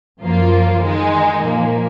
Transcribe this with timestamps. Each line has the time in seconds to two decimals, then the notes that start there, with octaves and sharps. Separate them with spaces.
0.21 F#2 F3 A#3 F4
0.81 D#3 G#3 D#4
1.40 A#2 F3 A#3